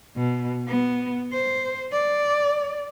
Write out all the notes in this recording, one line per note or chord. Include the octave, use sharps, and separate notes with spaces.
B2
B3
C5
D5